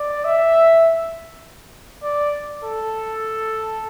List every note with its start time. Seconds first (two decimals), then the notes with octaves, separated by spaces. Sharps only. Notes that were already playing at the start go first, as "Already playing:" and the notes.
Already playing: D5
0.25 E5
2.03 D5
2.63 A4